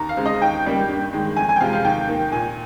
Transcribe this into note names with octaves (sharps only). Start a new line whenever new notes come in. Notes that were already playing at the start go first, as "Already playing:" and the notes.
Already playing: D#2 A#5
F5
C#3 G#3 C4
D#5
D#2 G5
C#3 G3 A#3
G2
D#3 G#3
F2 G#5
G#5
G5
C3 F3 G#3 F5
F5
D#2 G5
D#3 A#3
A#2 G#5